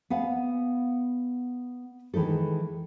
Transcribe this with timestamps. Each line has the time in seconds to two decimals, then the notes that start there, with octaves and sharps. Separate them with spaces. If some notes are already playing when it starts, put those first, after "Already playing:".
0.10 B3 F5 F#5 G#5
2.14 D#3 E3 G#3 D#4 A4